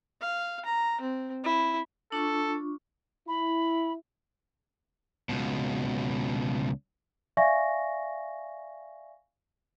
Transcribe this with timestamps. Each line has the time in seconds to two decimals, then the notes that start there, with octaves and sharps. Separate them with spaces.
0.22 F5
0.65 A#5
1.01 C4
1.44 E4
2.12 D4 F4 A4 C#6
3.28 E4 B5
5.29 C#2 B2
7.37 D5 E5 F5 G#5 C#6 A#6